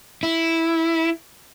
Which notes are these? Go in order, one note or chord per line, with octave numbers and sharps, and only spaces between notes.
E4